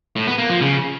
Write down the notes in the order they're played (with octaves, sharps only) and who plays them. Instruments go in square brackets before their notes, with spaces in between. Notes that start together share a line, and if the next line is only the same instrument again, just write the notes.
[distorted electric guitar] A2
B3
A#3
F3
C#3